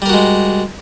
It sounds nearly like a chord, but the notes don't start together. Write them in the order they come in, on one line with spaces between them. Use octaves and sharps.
G3 A#4 F#4 G#3